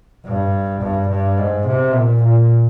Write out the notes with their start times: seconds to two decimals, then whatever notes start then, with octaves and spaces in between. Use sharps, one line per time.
0.25 G2
0.82 G2
1.10 G2
1.38 G#2
1.67 C3
1.94 A#2
2.23 A#2